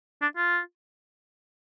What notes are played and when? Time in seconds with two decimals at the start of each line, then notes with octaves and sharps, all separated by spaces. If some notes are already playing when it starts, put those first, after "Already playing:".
0.22 D4
0.37 F4